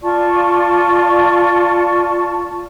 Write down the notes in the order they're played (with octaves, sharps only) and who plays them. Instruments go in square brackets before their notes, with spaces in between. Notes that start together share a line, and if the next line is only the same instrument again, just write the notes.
[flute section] F4 D5 A5 C#6